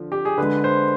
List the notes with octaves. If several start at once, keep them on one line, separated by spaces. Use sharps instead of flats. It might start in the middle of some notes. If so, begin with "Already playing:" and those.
Already playing: D3 F3
G4
G#4
D3 G#3 B4
C5